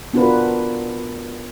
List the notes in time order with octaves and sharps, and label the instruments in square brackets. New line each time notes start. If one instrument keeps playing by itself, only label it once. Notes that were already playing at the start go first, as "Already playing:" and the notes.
[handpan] B3 D4 F4 F#4 A#4 B4